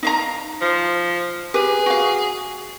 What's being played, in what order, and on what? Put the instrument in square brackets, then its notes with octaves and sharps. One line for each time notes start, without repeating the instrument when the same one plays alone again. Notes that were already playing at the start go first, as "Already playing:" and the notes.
[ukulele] D#4 F5 A#5
[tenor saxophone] F3
[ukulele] G4 B4 [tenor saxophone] G#4
[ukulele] F#4 F5